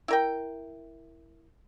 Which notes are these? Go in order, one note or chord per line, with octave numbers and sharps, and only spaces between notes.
E4 A#4 G5